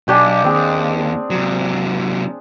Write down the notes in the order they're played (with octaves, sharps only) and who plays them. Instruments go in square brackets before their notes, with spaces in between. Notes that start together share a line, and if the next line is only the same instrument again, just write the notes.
[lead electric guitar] B1 [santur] D4 G4 G#5
[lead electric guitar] D#2 [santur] C4 G#4
[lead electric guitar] C3 F#3